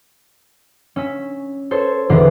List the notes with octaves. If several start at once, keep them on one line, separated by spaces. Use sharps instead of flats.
C#4 E6 B6
A4 C5 C#5
E1 E2 D3 C7